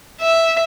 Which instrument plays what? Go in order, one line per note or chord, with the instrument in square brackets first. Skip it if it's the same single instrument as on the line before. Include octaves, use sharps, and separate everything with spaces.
[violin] E5